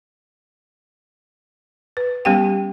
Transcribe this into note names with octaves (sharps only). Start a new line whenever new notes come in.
B4
G3 B3 C#4 G4 F5 G5